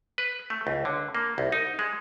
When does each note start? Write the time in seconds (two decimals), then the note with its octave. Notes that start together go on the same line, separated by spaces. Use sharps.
0.18 B4
0.50 A3
0.67 C#2
0.85 D3
1.15 A#3
1.38 C2
1.52 D#4
1.79 G#3